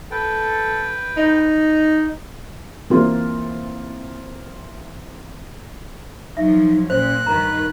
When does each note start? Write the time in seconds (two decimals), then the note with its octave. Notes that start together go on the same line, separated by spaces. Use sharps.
0.11 A4 B4 G5
1.17 D#4
2.90 E3 A#3 C4 F4
6.37 F3 F#3 D#4 E5
6.90 A#2 C#4 C5 F#6
7.27 G2 D#3 A#4 B4 A#5